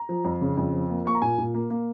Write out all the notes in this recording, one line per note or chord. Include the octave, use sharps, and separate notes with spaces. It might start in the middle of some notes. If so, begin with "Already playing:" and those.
Already playing: A#5
F3
F2
C#3
F2
F3
A#3
A#3 C#6
A#5
A#2 G#5
A#2
A#3
A#3